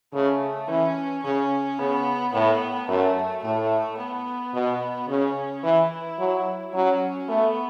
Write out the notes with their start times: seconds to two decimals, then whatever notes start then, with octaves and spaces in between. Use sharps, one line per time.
0.13 C#3 A3
0.68 E3 C#4
1.23 C#3 C#4
1.79 C#3 B3
2.33 A2 B3
2.89 F#2 A3
3.43 A2 A3
3.98 B3
4.53 B2
5.09 C#3 C#4
5.63 E3 E4
6.19 F#3
6.74 F#3 C#4
7.28 A3 B3